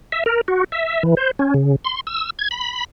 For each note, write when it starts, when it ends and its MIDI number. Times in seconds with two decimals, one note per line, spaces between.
0.12 0.24 76
0.26 0.41 70
0.48 0.64 66
0.72 1.03 76
1.03 1.15 52
1.17 1.31 72
1.39 1.54 61
1.54 1.76 49
1.85 2.01 84
2.07 2.30 88
2.39 2.49 92
2.51 2.84 83